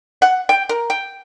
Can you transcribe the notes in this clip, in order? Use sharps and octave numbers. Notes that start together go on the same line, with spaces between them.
F#5
G5
A#4
G5